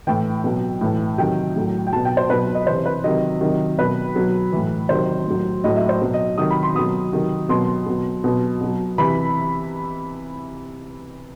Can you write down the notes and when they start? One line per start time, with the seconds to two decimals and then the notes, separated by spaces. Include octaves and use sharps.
0.07 A2 E3 G5
0.44 B2 F#3
0.81 A2 E3
1.18 C3 D#3 F#3 G5
1.56 A2 F#3
1.87 G5
1.93 B2 F#3 A5
2.05 G5
2.17 C5
2.30 B2 F#3 B4
2.55 D#5
2.67 C3 E3 C5
2.86 B4
3.04 C3 D#3 F#3 D#5
3.41 C3 D#3 F#3
3.78 B2 F#3 B4
4.15 B2 F#3
4.52 A2 E3
4.89 C3 D#3 F#3 C5
5.26 A2 F#3
5.64 A2 F#3 D#5
5.76 E5
5.89 C5
6.02 B2 F#3
6.14 D#5
6.38 C3 D#3 F#3 D#6
6.51 B5
6.63 C6
6.75 B2 F#3 D#6
7.13 C3 D#3 F#3
7.49 B2 F#3 C6
7.86 B2 F#3
8.24 B2 F#3
8.61 B2 F#3
8.98 C3 E3 B5